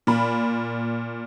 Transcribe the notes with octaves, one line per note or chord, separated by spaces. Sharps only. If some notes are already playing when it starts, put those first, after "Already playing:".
A#2 B5